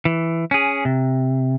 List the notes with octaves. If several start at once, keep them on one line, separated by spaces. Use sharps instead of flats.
E3
C#4 G#4
C3